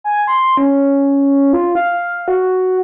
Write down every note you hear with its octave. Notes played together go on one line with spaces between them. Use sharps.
G#5
C6
C#4
F4
F5
F#4